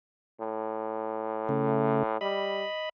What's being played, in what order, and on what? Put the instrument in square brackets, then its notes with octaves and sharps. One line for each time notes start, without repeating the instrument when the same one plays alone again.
[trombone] A2
[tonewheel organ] C#3 A3
[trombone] G3 [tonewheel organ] D#5 B5